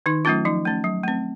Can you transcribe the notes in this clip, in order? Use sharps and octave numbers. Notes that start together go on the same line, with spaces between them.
D#3 D#4
F#3 A3 C#4 F4
F3 D#4
A3 C#4
F#3
A3 C4